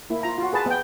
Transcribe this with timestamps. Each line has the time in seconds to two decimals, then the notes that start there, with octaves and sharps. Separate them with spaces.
0.10 A#3 E4
0.23 F4 A#5
0.38 F4 F#4
0.53 G#4 B4 A5
0.66 B3 G5